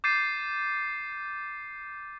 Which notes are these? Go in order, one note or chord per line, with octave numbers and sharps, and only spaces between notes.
D6 G6 A6 C7 D#7